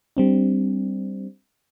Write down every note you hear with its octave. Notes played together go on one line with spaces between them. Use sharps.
G3 C4 D4